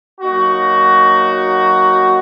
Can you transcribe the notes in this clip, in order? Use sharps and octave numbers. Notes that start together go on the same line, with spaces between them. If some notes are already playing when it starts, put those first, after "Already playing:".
F#3 A#3 D#4 F#4